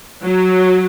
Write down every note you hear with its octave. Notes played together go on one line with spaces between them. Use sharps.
F#3